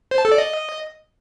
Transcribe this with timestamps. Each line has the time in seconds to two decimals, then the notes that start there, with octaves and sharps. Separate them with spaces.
0.11 C5
0.18 A5
0.25 A4
0.32 D5
0.38 D#5